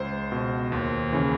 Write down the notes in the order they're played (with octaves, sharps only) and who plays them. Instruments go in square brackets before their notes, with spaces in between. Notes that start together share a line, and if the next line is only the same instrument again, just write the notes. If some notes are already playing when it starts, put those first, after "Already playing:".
Already playing: [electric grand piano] C#2 C5
B2
D#2
C#3 E3